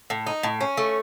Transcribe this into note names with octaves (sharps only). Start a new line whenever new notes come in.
A2
D#4
A2
C#4
A3